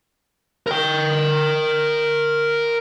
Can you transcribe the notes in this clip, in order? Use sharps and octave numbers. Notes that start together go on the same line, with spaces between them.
A#4 G5